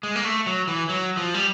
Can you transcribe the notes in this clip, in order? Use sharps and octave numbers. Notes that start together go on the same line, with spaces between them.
G#3
A#3
A3
F#3
E3
F#3
F3
G3